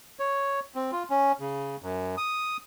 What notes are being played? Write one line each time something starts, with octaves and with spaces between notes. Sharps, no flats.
C#5
C4
F4
C#4
C#3
F#2
D#6